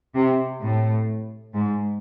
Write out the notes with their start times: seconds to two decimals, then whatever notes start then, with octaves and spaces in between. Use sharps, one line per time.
0.14 C3
0.61 A2
1.53 G#2